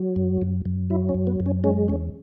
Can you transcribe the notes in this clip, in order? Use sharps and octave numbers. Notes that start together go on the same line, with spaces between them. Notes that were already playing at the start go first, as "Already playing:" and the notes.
Already playing: F#3
F#2
F#2
F#2
F#3 E4
C#4
F#2
B3
F#2
C#4
G#3 C#4
E2 C#4